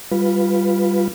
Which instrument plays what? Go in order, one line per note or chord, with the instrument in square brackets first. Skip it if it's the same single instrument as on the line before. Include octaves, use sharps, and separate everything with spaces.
[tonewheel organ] G3 F4 B4